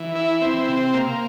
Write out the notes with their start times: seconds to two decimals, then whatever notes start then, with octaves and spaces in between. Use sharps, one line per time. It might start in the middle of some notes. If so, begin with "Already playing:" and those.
Already playing: E3
0.16 E4
0.41 C4
0.68 C3
0.94 A#3